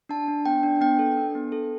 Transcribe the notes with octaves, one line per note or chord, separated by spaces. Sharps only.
D4 A5
D4
B3 G5
D4
B3 G5
A4
D4
B3
A4